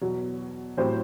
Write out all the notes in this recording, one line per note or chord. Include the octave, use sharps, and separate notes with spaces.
E2 B2 F#3
A2 F#3 C4 G4 C5